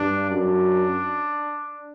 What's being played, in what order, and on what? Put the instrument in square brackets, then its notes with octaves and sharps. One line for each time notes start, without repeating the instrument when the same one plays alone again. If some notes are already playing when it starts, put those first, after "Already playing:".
Already playing: [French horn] G2 [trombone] D4
[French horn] F#2 [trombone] D4